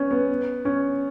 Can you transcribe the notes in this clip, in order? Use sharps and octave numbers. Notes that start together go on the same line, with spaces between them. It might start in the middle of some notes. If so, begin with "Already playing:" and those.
Already playing: B3 C#4
B3
C#4